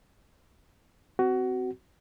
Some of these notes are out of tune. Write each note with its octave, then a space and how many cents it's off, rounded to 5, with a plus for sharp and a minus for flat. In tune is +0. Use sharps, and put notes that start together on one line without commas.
C4 -20 F#4 +20